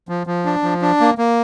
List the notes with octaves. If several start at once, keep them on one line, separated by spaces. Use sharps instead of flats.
F3
F3
D4
F3
D4
A#3
A#3